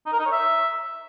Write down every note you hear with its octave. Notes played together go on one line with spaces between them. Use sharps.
D#4
A#4
D#4
C#5
E5